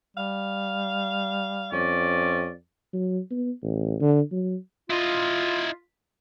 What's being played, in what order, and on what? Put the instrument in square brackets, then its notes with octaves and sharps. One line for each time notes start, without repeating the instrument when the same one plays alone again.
[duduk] G3 [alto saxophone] F5
[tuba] F2 [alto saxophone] C#4 [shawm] D5
[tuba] F#3
B3
A1
D3
F#3
[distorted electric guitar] E4 D#5 [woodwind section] F4